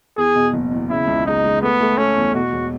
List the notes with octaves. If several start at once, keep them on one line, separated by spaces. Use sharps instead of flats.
E2 G#4
B2
F#1
E2
C#3 E4
C#2
G#3 D#4
G#3
A3 B3
A3
A3 C#4
E2
B2 F#4
E1